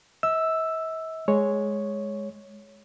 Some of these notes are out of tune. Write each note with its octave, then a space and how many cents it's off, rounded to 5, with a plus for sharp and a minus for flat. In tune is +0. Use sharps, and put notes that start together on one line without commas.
E5 -45 E6 +0
G#3 +0 C#5 +0